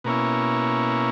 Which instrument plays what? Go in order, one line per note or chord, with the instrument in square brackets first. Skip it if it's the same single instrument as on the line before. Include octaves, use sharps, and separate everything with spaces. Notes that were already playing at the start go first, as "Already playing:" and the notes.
[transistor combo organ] B2 A#3 C#4 E4